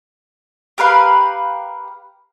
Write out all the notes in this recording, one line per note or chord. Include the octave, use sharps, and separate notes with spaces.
G4 A#4 B4 F5